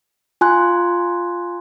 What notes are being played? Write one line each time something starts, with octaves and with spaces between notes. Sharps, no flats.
F4 G#5 C6 F#6